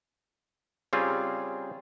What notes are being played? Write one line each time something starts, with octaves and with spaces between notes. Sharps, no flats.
C#3 G3 C4 F4 G#4